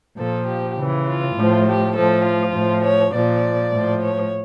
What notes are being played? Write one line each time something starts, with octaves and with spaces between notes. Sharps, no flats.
A#2 F3 A4
G4
C#3 E3
F4
A2 F3
G4
A2 F3 A4
F4
A2 F3
C#5
A#2 F3 D5
A2 F3
C#5